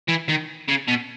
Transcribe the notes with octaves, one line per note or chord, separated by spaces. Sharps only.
E3
D#3
C#3
B2